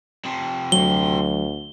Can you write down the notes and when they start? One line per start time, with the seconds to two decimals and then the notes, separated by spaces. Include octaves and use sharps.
0.25 C3 F3
0.72 D2 F#3 G7